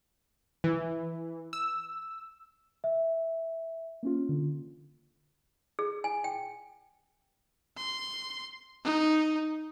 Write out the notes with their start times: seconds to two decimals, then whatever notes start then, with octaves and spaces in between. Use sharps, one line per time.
0.64 E3
1.53 E6
2.84 E5
4.03 A#3 C#4 F4
4.29 D3
5.79 G#4
6.04 G#5
6.24 G5
7.77 C6
8.84 D#4